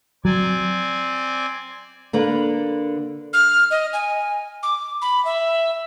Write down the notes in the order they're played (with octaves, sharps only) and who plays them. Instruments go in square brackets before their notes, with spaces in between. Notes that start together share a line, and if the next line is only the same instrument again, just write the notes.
[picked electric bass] F#3 [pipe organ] C4 D5 G#5
[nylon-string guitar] D3 A#3 B4
[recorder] F6
D#5
G#5
D6
B5
E5